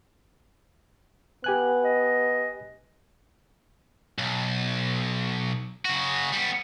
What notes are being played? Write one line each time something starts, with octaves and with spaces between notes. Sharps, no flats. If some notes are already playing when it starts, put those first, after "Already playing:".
B3 G4 G#5 F#6
D#5
B1
C#3 F#4
G3 B3